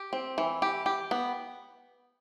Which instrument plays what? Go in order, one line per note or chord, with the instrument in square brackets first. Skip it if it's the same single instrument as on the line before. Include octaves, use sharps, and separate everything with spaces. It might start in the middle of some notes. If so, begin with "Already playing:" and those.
Already playing: [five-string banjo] G4
C4
E3
G4
G4
B3